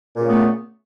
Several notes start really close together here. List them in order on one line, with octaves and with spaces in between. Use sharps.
A#2 C#3 A3 B3